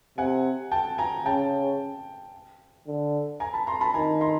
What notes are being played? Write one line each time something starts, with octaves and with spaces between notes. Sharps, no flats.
C3 F#5 G#5
G5 A5
G#5 A#5
C#3 G5 A5
D3
G#5 A#5
A5 B5
A#5 C6
A5 B5
D#3 G#5 A#5
A#5 C6